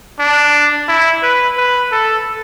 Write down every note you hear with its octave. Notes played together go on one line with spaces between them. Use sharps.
D4
E4
B4
B4
A4